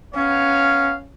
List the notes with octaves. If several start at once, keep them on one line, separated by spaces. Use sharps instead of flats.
B3 C#4 C#5 F5